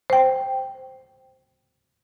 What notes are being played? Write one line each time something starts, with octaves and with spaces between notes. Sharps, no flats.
C5 G5